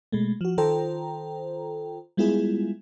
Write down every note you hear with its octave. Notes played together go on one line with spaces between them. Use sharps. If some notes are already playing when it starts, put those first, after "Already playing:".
B2 G#3 A3
F3 F#4
D#3 F4 A4 C5 G5 A#5
G3 G#3 B3 E4 F4 G#4